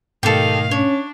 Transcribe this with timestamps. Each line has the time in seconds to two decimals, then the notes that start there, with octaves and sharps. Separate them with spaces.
0.23 G#2 B2 D#3 A3 G4 A4 F5
0.71 C#4 D4 C#5